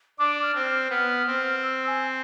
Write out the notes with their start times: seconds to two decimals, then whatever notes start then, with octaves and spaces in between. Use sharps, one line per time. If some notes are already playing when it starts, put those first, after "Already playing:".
0.19 D4 D6
0.42 F6
0.55 C4
0.66 F6
0.90 B3 F6
1.27 C4
1.63 E6
1.87 G#5